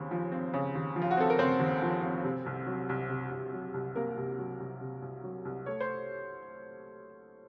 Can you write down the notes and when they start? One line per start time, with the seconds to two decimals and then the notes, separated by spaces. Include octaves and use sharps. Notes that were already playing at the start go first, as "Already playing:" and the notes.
Already playing: D#2 C#3 C4
0.11 F3
0.32 C4
0.54 C#3
0.75 D#2
0.96 F3
1.02 F4
1.11 F#4
1.17 C4 A4
1.30 A#4
1.39 C#3 C4 C5
1.60 D#2
1.82 F3
2.03 C4
2.24 C3
2.46 C2
2.67 F#3
2.89 C2
3.10 C3
3.31 C2
3.53 F#3
3.74 C2
3.95 C3 A#3 A#4
4.17 C2
4.38 F#3
4.60 C2
4.81 C3
5.02 C2
5.23 F#3
5.45 C2
5.66 A3 C#5
5.81 C5